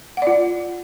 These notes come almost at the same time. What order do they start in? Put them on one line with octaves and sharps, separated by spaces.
F#5 D5 F4